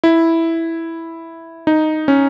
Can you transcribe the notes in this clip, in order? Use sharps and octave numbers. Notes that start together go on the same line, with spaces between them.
E4
D#4
C#4